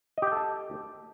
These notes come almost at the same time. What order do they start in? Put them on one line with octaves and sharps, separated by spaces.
D#5 G4 G5 A4 A5